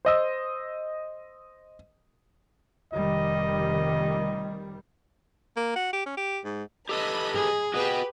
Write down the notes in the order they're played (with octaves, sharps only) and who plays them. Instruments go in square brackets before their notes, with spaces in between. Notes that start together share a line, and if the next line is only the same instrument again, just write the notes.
[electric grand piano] C5 D#5 E6
[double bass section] F1 D#3 G3 [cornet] D#5
[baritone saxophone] A#3
F#4
G4
C#4
G4
G#2
[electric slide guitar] G4 A4 B4 [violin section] D#5 B5
[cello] G#4
[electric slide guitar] F#4 D#5 [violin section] G4 B4